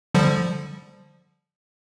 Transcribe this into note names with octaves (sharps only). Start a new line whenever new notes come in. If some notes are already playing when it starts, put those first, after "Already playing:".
D3 F3 G3